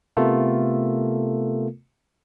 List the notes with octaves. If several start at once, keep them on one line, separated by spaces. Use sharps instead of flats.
C3 A3 B3 F4 A4 A#4